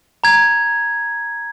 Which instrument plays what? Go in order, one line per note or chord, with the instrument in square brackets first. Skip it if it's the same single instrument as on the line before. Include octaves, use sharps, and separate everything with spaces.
[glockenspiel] A#5 G#6